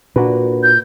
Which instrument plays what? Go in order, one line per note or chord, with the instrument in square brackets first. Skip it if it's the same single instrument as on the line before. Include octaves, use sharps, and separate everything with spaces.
[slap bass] A#2 [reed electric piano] D4 F#4 B4
[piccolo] G6